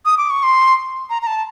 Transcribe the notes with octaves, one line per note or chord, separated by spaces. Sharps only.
D#6
D6
C#6
C6
A#5
A#5
A5